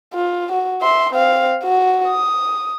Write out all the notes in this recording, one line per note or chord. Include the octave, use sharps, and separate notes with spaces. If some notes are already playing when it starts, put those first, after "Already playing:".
F4
F#4
E5 C6
C4 F5
F#4
D#6